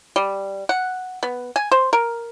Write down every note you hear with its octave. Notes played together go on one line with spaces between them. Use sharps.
G3
F#5
B3
G#5
C5
A#4